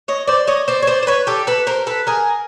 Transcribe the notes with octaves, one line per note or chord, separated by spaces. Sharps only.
C#5 D#5
C5 D5
C#5 D#5
C5 D5
C#5
C5 D5
C5
B4 C#5
G4 A4
A4 B4
A#4 C5
A4 B4
G#4 A#4